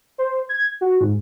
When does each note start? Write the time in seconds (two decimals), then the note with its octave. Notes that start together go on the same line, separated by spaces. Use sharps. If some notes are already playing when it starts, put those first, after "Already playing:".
0.18 C5
0.49 G#6
0.81 F#4
1.01 G#2